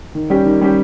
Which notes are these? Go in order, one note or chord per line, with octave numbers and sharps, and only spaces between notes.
D#3
G3 C#4 G4
D#3
G3 C#4 G4